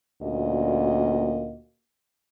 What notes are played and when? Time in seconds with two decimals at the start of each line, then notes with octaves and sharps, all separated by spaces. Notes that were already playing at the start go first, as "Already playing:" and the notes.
0.22 D2 A#2 A#3 C#4 F#4 D#5